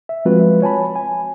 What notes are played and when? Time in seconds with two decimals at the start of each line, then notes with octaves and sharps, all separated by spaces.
0.09 E5
0.25 F3 G#3 C4 F4 F#4 B4
0.62 C#5 G#5 A5 B5
0.96 G#5